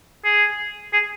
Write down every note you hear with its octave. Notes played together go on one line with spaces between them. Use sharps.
G#4
G#4